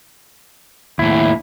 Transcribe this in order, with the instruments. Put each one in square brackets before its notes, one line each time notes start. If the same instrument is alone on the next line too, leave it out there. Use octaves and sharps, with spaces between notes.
[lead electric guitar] D#2 A2 [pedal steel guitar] E4